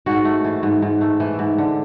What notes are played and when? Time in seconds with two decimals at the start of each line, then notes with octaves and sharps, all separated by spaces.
0.06 G#2 F#4
0.25 A3
0.44 E3
0.63 G#2
0.82 G#2
1.01 A3
1.20 E3
1.39 G#2
1.58 D3